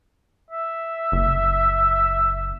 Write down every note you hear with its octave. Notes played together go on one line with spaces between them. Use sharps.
E5
F#1